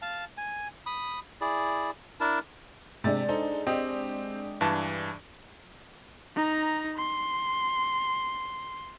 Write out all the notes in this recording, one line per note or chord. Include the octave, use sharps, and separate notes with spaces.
F5 A5
G#5
B5 D#6
E4 G#4 D5
D4 E4 A#4 A5
C3 G#3 D4 A6
D#4 A4 C5
C4 G4 D#5
G2 E3 A5
D#4 A#5
C6